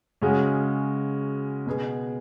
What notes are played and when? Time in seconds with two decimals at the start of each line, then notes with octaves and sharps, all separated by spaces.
0.22 C#3 G#3 C#4 F#4
1.66 B2 B3 G#4